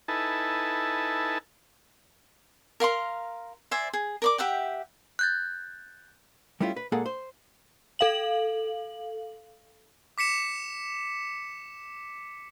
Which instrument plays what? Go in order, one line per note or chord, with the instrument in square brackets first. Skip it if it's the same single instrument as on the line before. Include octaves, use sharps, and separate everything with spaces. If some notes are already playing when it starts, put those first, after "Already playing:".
[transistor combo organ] D#4 E4 A4 B4 G#5 A5
[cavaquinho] A#4 F5 A#5 C6
C5 D5 E5 G#5
G#4
A#4 D5 D6
G4 E5 F#5 G5
[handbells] F#6 G6 A6
[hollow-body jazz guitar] G3 A3 C#4 E4 F4
B4
A#2 G#3 A#3 G#4 A4 F#5
C5
[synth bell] A4 F5 F#7
[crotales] D6 B6 C#7 E7